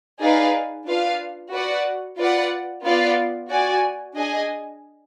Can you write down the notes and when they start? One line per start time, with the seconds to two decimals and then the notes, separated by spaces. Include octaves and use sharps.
0.21 D#4 G#4 B4 D5 F5
0.86 D4 F4 B4 F5
1.52 F#4 B4 D5 F#5
2.18 F4 B4 D5 F#5
2.84 B3 F4 B4 D5 F5
3.49 F#4 D5 G#5
4.15 D4 G#4 D#5 G#5